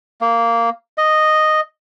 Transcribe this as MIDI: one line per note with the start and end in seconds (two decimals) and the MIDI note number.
0.21 0.70 58
0.98 1.61 75